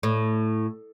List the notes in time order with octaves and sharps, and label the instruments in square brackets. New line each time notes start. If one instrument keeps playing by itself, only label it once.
[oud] A2